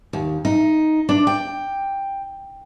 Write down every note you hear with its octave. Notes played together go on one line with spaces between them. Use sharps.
D#2
D#4
D4
G5